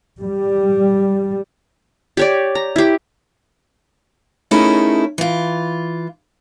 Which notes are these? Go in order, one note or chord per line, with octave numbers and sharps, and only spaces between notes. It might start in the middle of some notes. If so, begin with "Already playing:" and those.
G3
G4 C#5 D5
A#5
E4 G4
A3 C#4 D#4 E4 G#4 A#4
E3 F4